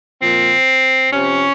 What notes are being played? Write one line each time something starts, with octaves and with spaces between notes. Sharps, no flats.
A#2 F3 C4
C3 F3 C#4